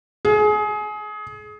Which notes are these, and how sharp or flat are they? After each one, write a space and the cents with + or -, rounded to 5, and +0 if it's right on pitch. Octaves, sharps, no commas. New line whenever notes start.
G#4 +25